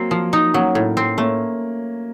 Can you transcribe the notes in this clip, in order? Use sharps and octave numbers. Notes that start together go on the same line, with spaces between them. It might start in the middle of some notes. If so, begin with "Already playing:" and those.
Already playing: F#3 A#3 C4
F3
D#4
F#3 A#3 C#4
A2
C4
A3 A#3 C#4